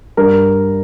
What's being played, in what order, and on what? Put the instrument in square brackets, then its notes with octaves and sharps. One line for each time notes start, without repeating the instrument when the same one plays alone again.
[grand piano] G2 A#4